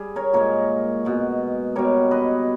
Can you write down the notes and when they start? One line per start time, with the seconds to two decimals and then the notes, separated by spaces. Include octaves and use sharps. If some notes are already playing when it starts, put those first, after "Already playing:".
Already playing: G3 G#4
0.16 A#4 C#5
0.33 A#2 G#3 A#4 C#5
1.05 B2 G#3
1.76 B2 G3 A#4 C#5
2.11 B4 D#5